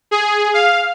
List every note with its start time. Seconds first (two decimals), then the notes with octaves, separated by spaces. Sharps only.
0.11 G#4
0.54 F5